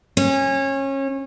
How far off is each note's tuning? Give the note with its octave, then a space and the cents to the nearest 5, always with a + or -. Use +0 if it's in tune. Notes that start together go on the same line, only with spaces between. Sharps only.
C#4 -25